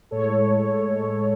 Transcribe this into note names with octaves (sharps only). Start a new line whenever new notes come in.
A2 G#3 A4 C#5
A2 G#3